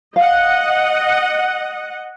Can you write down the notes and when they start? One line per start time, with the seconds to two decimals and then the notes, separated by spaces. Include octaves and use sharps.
0.16 D#5 F5 F#5